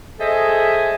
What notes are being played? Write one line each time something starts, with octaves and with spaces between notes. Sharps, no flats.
G#4 A4 C5 D#5 E5 G#5